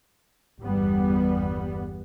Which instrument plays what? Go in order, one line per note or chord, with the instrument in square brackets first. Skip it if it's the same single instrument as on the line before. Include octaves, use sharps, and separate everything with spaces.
[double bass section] G1 E2 G3 B3